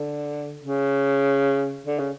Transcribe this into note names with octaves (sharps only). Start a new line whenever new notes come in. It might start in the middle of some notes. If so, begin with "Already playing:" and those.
Already playing: D3
C#3
D3
C#3